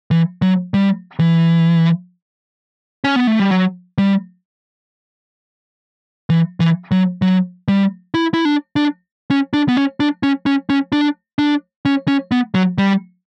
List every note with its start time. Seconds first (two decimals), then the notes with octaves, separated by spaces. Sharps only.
0.11 E3
0.42 F#3
0.74 G3
1.19 E3
3.04 C#4
3.16 B3
3.27 A3
3.39 G3
3.51 F#3
3.98 G3
6.30 E3
6.60 E3
6.91 F#3
7.22 F#3
7.68 G3
8.14 E4
8.34 E4
8.45 D4
8.76 D4
9.31 C#4
9.53 D4
9.69 B3
9.77 C#4
10.00 D4
10.23 C#4
10.46 C#4
10.70 C#4
10.92 D4
11.39 D4
11.85 C#4
12.08 C#4
12.32 B3
12.55 F#3
12.78 G3